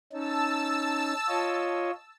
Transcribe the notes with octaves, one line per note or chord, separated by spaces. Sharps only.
C#4 D#4 A5 E6
F4 C#5 D#5